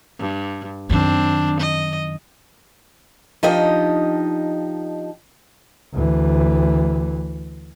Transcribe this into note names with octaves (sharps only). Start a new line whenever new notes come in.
G2
F#2 D#3 C4 D4
D#5
F3 D4 D#4 G4 D#5
D2 E3